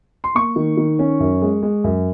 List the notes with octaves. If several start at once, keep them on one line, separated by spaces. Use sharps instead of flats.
C6
A#3 C#6
D#3
D#3
C#4
F#2
G#3
G#3
F#2